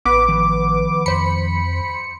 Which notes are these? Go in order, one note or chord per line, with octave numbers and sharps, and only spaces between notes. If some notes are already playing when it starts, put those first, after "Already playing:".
A1 B3 B4 D6
D#3 F3
F2 C5 B5 C#7